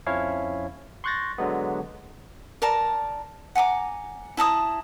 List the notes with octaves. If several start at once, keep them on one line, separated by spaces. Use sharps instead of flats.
F2 F3 C#4 E4 C#5 F5
C6 C#6 F#6 G6 A6 A#6
D3 F#3 G#3 B3
A#4 D5 A5 A#5
F#5 G#5 A#5 D6
E4 A5 A#5 D#6